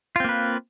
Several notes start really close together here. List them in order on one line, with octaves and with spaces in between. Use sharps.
F4 C4 A#3 B4